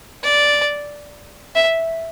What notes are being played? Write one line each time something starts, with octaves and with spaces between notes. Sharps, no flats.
D5
E5